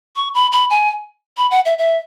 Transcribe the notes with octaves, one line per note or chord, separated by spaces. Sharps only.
C#6
B5
B5
G#5
B5
F#5
E5
E5